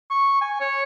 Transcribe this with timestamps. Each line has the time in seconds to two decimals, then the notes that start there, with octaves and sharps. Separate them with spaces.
0.10 C#6
0.41 G#5
0.60 C#5